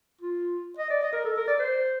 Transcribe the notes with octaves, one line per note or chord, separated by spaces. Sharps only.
F4
D#5
D5
D#5
A#4
A4
A#4
D5
C5